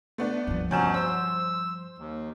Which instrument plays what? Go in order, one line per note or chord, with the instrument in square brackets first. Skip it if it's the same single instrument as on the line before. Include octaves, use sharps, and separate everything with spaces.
[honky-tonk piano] A3 B3 D4
[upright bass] G2 F3
[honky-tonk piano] D2 G6 E7 [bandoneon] B2 F#3 C#4
[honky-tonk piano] C5 [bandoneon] E6
[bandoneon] D#2